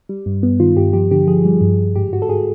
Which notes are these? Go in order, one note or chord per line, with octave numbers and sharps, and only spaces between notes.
G3
G2
G2 B3
D#3 F4
G2 G4
F3 G4
D3 G4
F3 G#4
G3
G2
G2
G#2 G4
G#2 F#4
A4
G#2 G#4